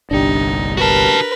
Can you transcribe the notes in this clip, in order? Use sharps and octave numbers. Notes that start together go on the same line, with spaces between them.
G1 C2 D4 D#4 G4
F#4 A#4 B4 A5